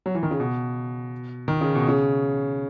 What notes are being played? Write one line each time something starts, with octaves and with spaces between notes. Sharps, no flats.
F#3
E3
D#3
C#3
B2
D#3
C#3
B2
C#3